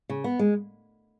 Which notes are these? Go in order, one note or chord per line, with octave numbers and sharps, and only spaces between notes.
C#3
B3
G#3